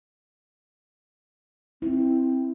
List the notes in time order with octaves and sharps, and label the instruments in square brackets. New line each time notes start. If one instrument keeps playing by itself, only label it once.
[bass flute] C4 [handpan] E4